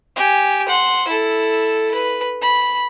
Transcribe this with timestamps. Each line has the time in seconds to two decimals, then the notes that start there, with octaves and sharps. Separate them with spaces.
0.16 G4 G#5
0.68 F#5 C6
1.08 E4 A4
1.95 B4
2.42 B5